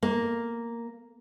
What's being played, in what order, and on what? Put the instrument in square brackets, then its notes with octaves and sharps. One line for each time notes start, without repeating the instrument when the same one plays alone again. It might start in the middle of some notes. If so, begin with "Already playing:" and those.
[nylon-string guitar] A#3